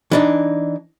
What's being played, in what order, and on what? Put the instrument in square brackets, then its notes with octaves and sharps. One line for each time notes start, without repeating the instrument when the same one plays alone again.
[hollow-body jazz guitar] E3 D4 D#4